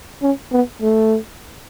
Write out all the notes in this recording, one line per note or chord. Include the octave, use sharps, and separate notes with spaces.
C#4
B3
A3